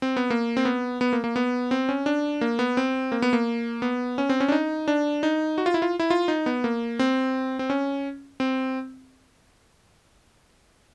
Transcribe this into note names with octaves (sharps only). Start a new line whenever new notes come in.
C4
B3
A#3
C4
B3
B3
A#3
A#3
B3
C4
C#4
D4
A#3
B3
C4
A#3
B3
A#3
B3
C#4
C4
C#4
D4
D#4
D4
D#4
F#4
F4
E4
F4
E4
F4
D#4
B3
A#3
C4
C4
C#4
C4